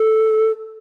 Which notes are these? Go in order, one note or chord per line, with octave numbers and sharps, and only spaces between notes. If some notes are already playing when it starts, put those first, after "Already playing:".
Already playing: A4